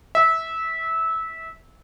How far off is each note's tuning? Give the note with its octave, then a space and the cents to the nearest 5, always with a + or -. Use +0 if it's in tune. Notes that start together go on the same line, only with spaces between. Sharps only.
E5 -20